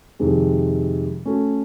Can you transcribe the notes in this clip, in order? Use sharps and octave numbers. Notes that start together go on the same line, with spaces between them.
F2 C3 D#3 G#3
A3 C#4 F#4 A4